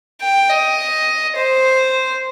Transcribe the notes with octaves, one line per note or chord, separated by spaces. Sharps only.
G5
D#5
C5